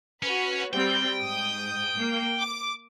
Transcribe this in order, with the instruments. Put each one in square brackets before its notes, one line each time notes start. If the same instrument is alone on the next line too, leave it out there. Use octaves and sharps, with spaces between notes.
[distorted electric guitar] C#4 [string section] F#4 B4
[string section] G3 C4 [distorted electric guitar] G5
[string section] G#2 D#6
A#3
D6